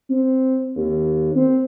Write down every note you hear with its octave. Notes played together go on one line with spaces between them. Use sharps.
C4
D#2
C4